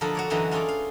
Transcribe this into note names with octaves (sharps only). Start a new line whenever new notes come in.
D3 F3 A4 A#4 D#5 B5
F#4 C#5 D5
F#2 D3 E3 D#4 F#4 D#5
C#4 F4 G#4 A4 D5
F5